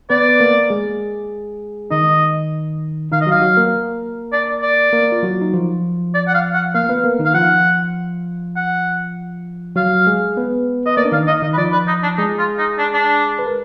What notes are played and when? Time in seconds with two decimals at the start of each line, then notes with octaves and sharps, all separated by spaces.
0.10 B3 B4 D5
0.29 B4
0.40 A#3 A#4
0.70 G#3 G#4
1.91 D#3 D#4 D#5
3.12 D#3 D#4 F5
3.21 D#5
3.26 F#3 F#4 F5
3.42 F#3 F#4
3.57 A#3 A#4
4.32 D5
4.62 D5
4.93 A#3 A#4
5.12 F4
5.23 F#3 F#4
5.41 D#4
5.53 F3 F4
6.14 D5
6.27 F#5
6.34 F5
6.54 F#5
6.74 A#3 A#4 F5
6.89 B3 B4
7.04 A#3 A#4
7.19 D#3 D#4
7.25 F5
7.34 F3 F4 F#5
8.56 F#5
9.76 F#3 F#4 F5
10.07 G#3 G#4
10.37 B3 B4
10.86 B4 D#5
10.97 A#3 A#4 D5
11.05 D4
11.12 D#3 D#4 F5
11.27 D#5
11.42 D#3 D#4 D#5
11.53 B4
11.57 F3 F4 D5
11.72 B4
11.87 D#4
12.03 D4
12.17 G#3 D#4 G#4
12.39 F4
12.58 D#4
12.78 D4
12.94 D4
13.39 B4
13.46 A#4